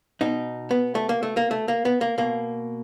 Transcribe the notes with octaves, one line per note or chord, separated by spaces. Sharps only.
B2 D#4
B3
A3
A#3
A3
A#3
A3
A#3
B3
A#3
B2 A#3